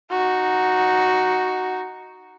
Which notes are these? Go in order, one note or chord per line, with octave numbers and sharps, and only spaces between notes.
D#4 F#4